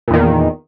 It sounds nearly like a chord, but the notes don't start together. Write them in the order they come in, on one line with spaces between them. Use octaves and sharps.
A#2 E2 D#3